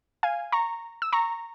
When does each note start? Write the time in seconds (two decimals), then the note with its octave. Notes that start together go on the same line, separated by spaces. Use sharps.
0.23 F5 G#5
0.52 A#5 C#6
1.02 E6
1.12 A#5 C#6